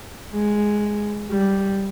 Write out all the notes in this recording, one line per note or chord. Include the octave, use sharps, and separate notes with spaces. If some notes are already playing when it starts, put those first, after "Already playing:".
G#3
G3